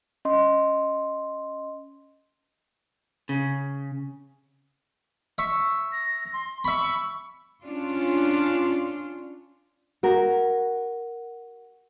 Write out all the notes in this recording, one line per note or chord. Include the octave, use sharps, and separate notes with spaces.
C#4 D#5 C6
C#3
E5 C#6
A#6
C6
E5 B5 C#6
C#4 D4 F4
F#4 A#4